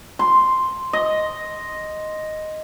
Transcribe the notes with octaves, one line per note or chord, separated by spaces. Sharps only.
C6
D#5